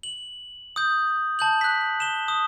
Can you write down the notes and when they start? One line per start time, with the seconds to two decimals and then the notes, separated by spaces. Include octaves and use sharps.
0.03 F#7
0.76 D#6 G6
1.39 A5 G6 F#7
1.61 F#6 B6
2.00 E7 G7
2.28 D#6